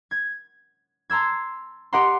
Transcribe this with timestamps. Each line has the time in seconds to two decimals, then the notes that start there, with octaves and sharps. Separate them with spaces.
0.11 G#6
1.10 A5 A#5 C6 E6 G#6
1.93 G4 D#5 F#5 A#5 C6